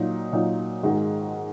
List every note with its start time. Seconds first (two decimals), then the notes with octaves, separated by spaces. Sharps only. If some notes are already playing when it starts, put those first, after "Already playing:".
Already playing: A#2 F#3 D#4
0.32 A#2 F#3 D#4
0.83 G#2 D#3 G#3 F#4